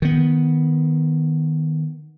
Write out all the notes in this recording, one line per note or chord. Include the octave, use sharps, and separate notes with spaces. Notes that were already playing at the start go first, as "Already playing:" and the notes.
D#3 B3